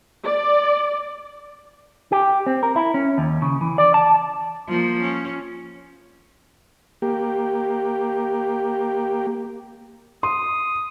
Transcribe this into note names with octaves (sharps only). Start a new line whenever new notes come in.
D5
G4
C4
A#4
E4
C#4
D#2
C#3
E3
D5
A5
F3 A#3
C#4
A#3 G4
C6 D#6